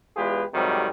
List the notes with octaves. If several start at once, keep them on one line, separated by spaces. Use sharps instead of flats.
E2 G#3 F4 G4 G#4 B4
F2 G#2 C3 D#3 F#3 G3